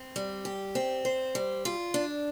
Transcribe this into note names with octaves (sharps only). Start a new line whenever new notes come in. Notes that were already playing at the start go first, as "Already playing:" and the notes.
Already playing: C4
G3
G4
C4
C5
G3
F4
D4